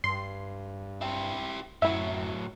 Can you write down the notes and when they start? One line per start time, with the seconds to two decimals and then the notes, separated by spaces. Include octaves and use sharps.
0.04 G2 C6
1.01 E4 G4
1.82 F#2 A2 F#3 E4 E5